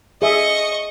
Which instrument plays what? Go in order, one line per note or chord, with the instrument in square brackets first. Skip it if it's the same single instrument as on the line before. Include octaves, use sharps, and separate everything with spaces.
[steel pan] G#4 E5 [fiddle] D#5 C#6